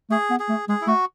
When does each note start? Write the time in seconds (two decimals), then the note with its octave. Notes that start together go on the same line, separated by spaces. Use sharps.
0.10 A3 G#4
0.30 B3
0.40 G#4
0.49 A3
0.69 G#3 G#4
0.81 E4
0.87 A3 F#4